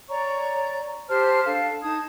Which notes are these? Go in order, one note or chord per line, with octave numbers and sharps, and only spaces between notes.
C#5 D5 A#5 C#6
G4 C5 A5 F6
D4 A4 F5 A5
D#4 A5 D#6 G#6